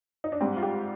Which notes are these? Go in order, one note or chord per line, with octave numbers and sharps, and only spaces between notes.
D#4
D4
G#2 G3 C4
F4
G4